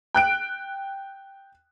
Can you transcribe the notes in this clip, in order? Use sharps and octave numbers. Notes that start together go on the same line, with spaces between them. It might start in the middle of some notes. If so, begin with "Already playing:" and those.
G5 F#6 D7